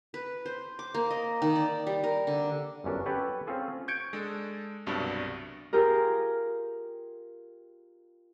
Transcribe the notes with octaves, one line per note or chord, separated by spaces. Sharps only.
B4
C5
D6
A#3
D#5
D#3
D5
G3
A#4
D3
G1 F#2 C#4 D4
G4 A4 B4 C#5 F#5 A5
C4 C#4 F4 G#4 A4
C#6 G6 G#6 C#7 D7
G#3 D4 A4
C2 G2 B2 F#3 D4
F4 G4 G#4 A#4